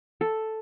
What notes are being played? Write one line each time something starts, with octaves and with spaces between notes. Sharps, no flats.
A4